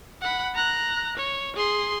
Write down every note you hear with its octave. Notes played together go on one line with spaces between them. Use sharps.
F#5 B5
A#5 F#6
C#5
G#4 C6